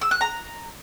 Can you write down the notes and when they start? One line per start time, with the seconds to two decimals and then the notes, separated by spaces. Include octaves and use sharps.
0.01 E6
0.11 F#6
0.21 A#5